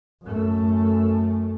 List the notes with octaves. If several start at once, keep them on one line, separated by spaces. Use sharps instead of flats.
F#2 A3